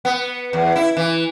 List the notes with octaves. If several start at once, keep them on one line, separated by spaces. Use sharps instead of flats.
B3
E2
E4
E3